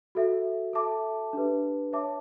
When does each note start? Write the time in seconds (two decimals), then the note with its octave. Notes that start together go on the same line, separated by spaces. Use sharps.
0.15 F#4 A4 E5
0.73 A4 E5 A5 D6
1.33 D4 G4 B4
1.93 C#5 E5 A5 D6